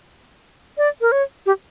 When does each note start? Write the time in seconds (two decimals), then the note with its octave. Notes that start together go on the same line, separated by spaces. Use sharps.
0.78 D5
1.01 A#4
1.12 C#5
1.46 G4